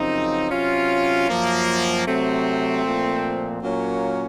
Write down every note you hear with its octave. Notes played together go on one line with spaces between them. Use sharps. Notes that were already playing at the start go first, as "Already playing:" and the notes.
Already playing: F#2 C#3 F3 C4 D#4
C3 F#3 C#4 F4
F#2 F3 A#3
C3 F#3 A3 C4
A#2 F3
A#2 F#3 A#3 C#4